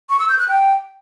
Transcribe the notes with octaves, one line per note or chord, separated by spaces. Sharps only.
C#6
E6
G6
F#6
G5